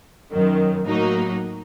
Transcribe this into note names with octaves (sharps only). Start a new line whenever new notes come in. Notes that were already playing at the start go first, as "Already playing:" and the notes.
F#2 D#3 F#3
A2 F#3 A#3 D#4 F#4